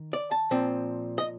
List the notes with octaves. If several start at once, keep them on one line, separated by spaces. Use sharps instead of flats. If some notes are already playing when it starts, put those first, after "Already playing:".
Already playing: D#3
D5
A5
A#2 F3 C4
D#5